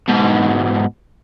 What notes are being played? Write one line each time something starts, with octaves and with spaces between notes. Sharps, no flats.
G#2 B2